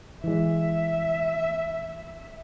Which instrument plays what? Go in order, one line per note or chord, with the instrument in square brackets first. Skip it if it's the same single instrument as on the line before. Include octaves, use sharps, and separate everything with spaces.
[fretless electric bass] E3 G#3 [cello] E5